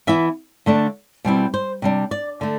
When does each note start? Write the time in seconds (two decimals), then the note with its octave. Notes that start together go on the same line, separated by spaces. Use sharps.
0.07 E3 B3 E4 E5
0.66 D3 A3 D4
1.25 B2 G3 C4 E4
1.54 C5
1.82 C3 G3 D4
2.11 D5
2.41 D3 A3